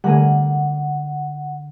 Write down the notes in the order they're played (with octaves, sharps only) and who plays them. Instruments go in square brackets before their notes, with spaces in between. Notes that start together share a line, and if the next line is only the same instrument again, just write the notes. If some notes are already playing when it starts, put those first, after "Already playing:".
[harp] D3 A#4 D#7 [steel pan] G3 A3 G#5 [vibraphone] F#5